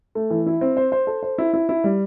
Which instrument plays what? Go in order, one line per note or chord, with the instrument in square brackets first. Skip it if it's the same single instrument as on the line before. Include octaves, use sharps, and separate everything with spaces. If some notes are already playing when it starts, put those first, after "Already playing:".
[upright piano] A3
E3
E4
C4
C5
C5
A4
C5
E4
E4
E4
G3